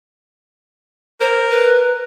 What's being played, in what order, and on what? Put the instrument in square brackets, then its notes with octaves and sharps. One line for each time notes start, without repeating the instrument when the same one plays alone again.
[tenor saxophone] A#4 [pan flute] C5
[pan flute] B4